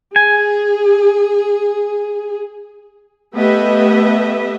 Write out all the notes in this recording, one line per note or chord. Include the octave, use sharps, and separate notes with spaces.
G#4 G#5
A3 B3 G4 B4 D#5 E5